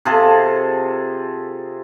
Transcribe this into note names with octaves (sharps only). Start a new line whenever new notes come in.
C3 F4 G#4 A4